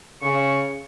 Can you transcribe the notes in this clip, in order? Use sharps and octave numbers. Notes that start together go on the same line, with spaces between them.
C#3 C#6